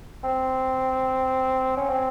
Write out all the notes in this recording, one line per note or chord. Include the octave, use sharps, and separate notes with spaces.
C4
C#4
C4